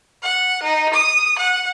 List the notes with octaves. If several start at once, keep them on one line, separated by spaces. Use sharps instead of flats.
F#5
D#4
D#6
F#5